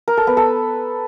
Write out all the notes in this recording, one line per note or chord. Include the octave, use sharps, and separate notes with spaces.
A#4
A4
B3
A4